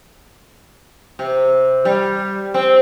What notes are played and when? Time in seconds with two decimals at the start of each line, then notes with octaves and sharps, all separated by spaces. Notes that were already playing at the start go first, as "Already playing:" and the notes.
1.19 C3
1.85 G3
2.54 C4